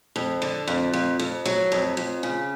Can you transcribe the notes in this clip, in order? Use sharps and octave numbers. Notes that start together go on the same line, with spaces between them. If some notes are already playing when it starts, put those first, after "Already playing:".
F2
D3
F2
F2
F2
F#3
F2
F2
C#3